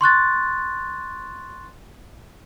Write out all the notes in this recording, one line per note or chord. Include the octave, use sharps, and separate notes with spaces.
C6 C#6 F#6 A6